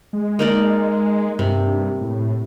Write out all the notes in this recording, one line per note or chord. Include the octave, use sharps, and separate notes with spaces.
G#3
A#3 D#4 D5
G2 C3
A2